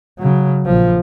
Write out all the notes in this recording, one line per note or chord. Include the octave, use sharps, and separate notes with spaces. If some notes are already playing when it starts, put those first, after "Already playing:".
C#3 F#3
A#1 F3